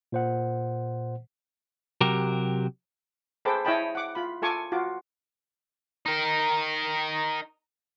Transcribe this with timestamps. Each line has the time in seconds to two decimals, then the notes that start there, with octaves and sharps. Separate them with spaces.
0.12 A#2 C5 F#5
2.01 C3 F#3 G4 A#4
3.45 G#4 A4 B4 C5 G5 D6
3.65 E4 C#5 D#5 G5 A5 B5
3.95 F#5 D6
4.15 F4 B5
4.42 F4 A4 G#5 C#6 D6
4.72 F4 F#4 D6
6.06 D#4 A#4